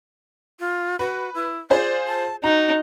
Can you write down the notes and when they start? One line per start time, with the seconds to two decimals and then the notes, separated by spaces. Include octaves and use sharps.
0.60 F4
0.99 F#4 B4
1.34 E4
1.70 F4 G#4 C5 D5
2.07 A5
2.44 D#4 F#4 A#5